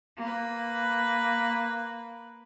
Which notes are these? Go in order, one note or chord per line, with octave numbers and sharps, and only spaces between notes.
A#3 B4